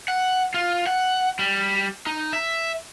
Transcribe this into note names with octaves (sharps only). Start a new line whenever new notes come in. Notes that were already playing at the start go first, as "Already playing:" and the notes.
F#5
F4
F#5
G3
D#4
E5